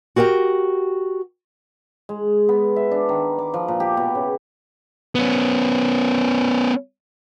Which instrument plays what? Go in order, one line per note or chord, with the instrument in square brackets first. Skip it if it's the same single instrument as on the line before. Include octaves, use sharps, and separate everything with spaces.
[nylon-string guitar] F#4 G4 A#4 F#5 G5
[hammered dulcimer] G#3
B3
E5
D4
D#3
D6
F3
A#2
G4
B2
C#3
[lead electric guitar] B3 C#4